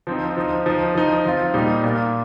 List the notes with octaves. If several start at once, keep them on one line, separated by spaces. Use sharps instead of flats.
F3 C4 D#4
F3 D#4
F3 D#4
F3 D#4
F3 C4 F4
A#2 G3 D#4
A#2 A#3 F4